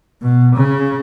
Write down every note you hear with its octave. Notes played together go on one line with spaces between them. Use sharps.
B2
C#3